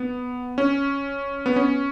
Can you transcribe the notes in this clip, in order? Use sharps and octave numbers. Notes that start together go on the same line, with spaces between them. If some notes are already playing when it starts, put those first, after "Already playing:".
Already playing: B3
C#4
B3
C#4